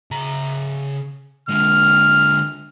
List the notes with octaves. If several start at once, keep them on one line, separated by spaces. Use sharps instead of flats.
C#3 A#5
D3 G#3 F6